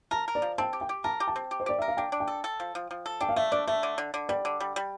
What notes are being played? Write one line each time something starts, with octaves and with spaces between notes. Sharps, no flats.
A#4 A5
A#4
D5
F3
C4 A5
G4
G5
G4
A#4 A5
G4
A5
C4
G4
C5
G4 D5
A#4 E5
F5
D4 G5
D4
G5
A4
A4
F3
F3
F3
A4
D4 G5
F5
A3 E5
D4 D5
A3 E5
D3
D3
D3
G3 D5
D3
G3
G3